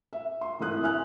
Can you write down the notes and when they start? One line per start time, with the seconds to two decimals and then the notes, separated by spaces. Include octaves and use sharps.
0.13 E5
0.41 C6
0.60 G#1 E3 A3 D#6 F#6
0.82 E5 G#5 F6 F#6